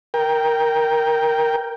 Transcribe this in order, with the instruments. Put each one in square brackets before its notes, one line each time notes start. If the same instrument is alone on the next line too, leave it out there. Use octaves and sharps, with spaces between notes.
[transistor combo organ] A#4 G5